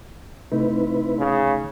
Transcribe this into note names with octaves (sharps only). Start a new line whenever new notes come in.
C3 A3 C4 D#4 E4 B4
C#3